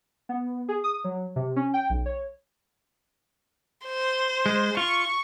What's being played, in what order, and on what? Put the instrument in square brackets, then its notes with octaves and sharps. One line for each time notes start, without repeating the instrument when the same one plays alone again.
[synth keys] B3
G#4
D#6
F#3
C3
C#4
G5
B1
C#5
[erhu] C5
[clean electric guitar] G#3
[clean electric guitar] F4 [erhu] C#6